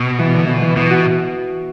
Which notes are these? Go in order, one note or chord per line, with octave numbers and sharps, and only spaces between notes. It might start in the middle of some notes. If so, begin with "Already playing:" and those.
Already playing: B2
E3
D3
E3
E3
B2 E3
F#4